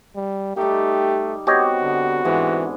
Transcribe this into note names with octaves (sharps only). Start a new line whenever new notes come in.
G3
G3 A3 D#4 G4
B3 C4 F#4 G4 C#5 D#5
D3
G#2 D3 E3 G#3